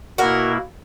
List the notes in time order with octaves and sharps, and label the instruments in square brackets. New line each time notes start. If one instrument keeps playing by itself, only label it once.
[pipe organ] B2 A#3 E4 [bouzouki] F#4 A#4